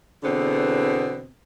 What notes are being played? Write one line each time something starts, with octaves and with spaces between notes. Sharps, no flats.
E2 B2 D3 B3 C4